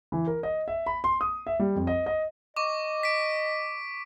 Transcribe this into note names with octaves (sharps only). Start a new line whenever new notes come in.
E3
A#4
D#5
E5
B5
C6
D#6
E5
G3
F2
D#5
D#5
D#5 C#6 D6
B6 D7